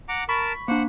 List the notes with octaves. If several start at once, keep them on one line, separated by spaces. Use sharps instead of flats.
F#5 A#5 D6
A#4 A5 B5 C#6 B6
A#3 D4 C5 F#5